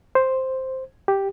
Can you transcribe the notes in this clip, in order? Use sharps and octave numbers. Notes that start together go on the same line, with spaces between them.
C5
G4